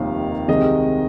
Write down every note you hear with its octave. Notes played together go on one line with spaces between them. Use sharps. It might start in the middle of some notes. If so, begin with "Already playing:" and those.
Already playing: F1 D#2 D#3 G3 A#3 F5
C2 C3 D#3 G#3 D#5